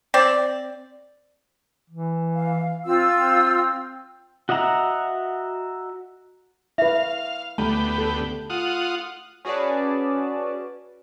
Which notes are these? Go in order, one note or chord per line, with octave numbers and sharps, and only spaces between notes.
C4 D5
E3
F5
C4 F4 E6
C4
F#4 D#5 E5 F#5 A#5
E4 B4 E5 F5
D2 A3 B3 G4 A5
A4
F4 F#5 D#6
C#4 F#4 G#4 B4 D5 A5